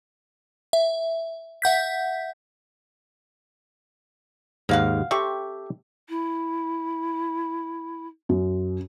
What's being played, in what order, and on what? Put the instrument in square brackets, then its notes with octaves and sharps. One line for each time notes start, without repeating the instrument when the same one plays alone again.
[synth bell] E5
E5 F#5 G6 B6
[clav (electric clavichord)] D#2 G#2 [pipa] A#3 F5 F#5
[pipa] C4 C#6 [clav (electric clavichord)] G4 A4 E5
[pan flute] E4
[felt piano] F#2